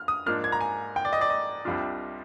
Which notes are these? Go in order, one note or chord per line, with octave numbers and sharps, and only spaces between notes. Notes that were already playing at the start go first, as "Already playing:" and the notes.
Already playing: F6
D#6
G#2 F3 A#3 D4 F6
G#6
A#5
G#5
G5
D5
D#5
D5
D#5
C2 C3 G3 D4 F4